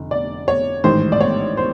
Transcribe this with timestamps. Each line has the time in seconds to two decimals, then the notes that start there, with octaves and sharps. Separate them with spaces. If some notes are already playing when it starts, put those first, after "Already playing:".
Already playing: F1 D3
0.11 D5
0.48 C#5
0.84 A1 G#2 D#3 C5
1.12 D5
1.21 C#5
1.57 C5